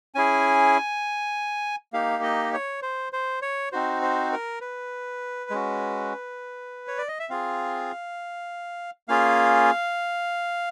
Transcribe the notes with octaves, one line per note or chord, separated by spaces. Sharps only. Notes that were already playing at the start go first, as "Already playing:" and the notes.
C#4 E4 G#4 G#5
A#3 D#4 G4 F5
D#5
C#5
C5
C5
C#5
C4 D#4 F#4 C5
C5
A#4
B4
G#3 C#4 F#4
C#5
D5
D#5
E5
C4 F4 G#4 F5
A#3 C#4 F4 G#4 F5